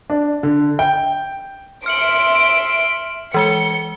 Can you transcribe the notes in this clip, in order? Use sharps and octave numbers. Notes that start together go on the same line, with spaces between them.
D4
D3
G5
E5 C6 F6 C#7 D7 F#7
E3 G#3 C#7 G7